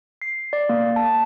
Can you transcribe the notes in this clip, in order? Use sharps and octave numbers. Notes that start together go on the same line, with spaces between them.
C7
D5
A#3
A5